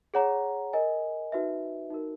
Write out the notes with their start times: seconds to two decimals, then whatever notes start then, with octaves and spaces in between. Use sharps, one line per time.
0.14 G#4 C#5 F#5 A#5
0.73 A#4 D#5 G#5
1.32 D#4 F#4 B4 E5
1.90 D#4 F#4 A#4